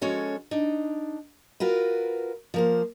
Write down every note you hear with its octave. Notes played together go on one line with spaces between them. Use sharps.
F3 G#3 C#4 F#4 A4 C#5
D4 D#4
F4 F#4 A#4 B4
F3 A#3 C5